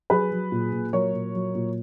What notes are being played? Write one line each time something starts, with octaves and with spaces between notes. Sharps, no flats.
F#3 G#4 B4
F#3
A#2
A#2
F#3 A#4 C#5
A#2
F#3
A#2